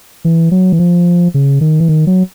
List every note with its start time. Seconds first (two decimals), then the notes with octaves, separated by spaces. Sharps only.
0.25 E3
0.51 F#3
0.72 E3
0.79 F3
1.34 C#3
1.61 D#3
1.80 E3
1.88 D#3
2.07 F#3